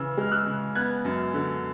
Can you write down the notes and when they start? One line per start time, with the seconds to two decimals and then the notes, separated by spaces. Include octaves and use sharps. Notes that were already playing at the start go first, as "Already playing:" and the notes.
Already playing: C#3 E3 E6
0.17 G#3 F6
0.31 E6 F#6
0.46 C#3
0.75 B3 F#6 G#6
1.05 F#2
1.34 D3